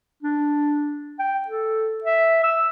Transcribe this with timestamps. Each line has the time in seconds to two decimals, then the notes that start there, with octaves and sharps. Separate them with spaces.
0.23 D4
1.19 G5
1.48 A4
2.04 E5
2.44 E6